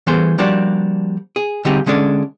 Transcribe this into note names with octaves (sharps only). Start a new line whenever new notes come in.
E3 G3 B3 G#4 A4 C5
F3 G3 A#3 D4 F#4 D5
G#4
D3 G3 C4 D#4 G4 G#4
D3 G#3 C#4 D4 A4